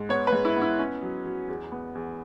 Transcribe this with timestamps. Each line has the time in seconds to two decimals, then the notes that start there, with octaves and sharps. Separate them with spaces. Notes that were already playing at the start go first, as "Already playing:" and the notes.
Already playing: G#2
0.09 B3 C#5
0.27 B4
0.32 G#2
0.45 E4
0.56 B3
0.62 E4
0.79 C#4
1.02 F#3
1.26 F#3
1.48 E2
1.72 B3
1.95 E2